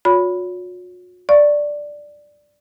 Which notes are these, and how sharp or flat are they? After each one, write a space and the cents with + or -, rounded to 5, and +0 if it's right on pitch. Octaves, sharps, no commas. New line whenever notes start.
F#4 -45 C#5 +30 B5 +0
D5 +0 F5 +5 C#6 -5